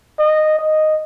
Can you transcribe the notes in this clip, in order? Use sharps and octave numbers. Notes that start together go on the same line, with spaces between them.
D#5
D#5